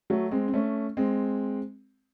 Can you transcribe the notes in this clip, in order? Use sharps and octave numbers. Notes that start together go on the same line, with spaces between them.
F#3 A3
G#3 C4
C4
A3 C#4
G#3 C4